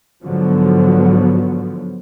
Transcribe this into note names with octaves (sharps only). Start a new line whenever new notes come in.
G#2 D3 F3 F#3 B3